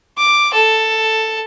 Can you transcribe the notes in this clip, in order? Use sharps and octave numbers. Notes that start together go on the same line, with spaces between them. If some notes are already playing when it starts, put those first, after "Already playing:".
D6
A4